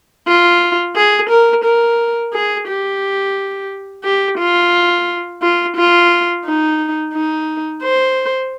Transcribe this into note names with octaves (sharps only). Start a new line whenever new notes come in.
F4
G#4
A#4
A#4
G#4
G4
G4
F4
F4
F4
D#4
D#4
C5